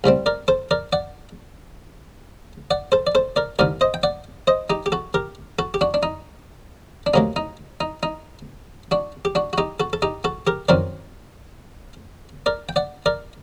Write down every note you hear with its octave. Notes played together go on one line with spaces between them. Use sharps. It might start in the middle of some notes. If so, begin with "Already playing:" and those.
C2 C3 G3 C4
A#4 D5
A4 C5
A#4 D5
D5 F#5
D5 F#5
A4 C5
D5
A4 C5
A#4 D5
C2 C3 D#3 A#4 D5
C5 D#5
G5
D5 F#5
C5 D#5
D#4 G4
G4
F#4 A4
G4 A#4
F#4 A4
G4
D4 F#4
D4
D#4
D4
D2 C3 F#3 A#3 D#4
D#4
D#4
D#4
D4 F#4
G4
D4 F#4
F#4
D#4 G4
F#4 A4
A4
D#4 G4
F#4 A4
G4 A#4
F#2 D#3 F#3 C4 A#4 D5
A#4 D5
G5
D5 F#5
A#4 D5